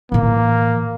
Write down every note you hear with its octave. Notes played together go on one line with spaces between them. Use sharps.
A2 E3 A#3